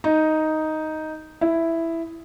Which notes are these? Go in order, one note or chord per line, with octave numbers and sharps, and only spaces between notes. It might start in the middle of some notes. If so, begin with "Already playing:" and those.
D#4
E4